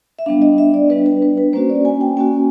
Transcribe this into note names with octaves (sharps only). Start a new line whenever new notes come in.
E5
G3 B3 D4 F5
D#5
E5
D5
G3 B3 D4 B4
B4
B4
B4
A#3 C#4 F#4 C5
D5
G#5
G5
A#3 C#4 F#4 G#5